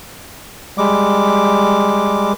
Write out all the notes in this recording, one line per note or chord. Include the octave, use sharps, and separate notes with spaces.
G3 G#3 D6